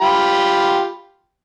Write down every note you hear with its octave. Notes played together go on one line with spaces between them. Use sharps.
F4 G4 B5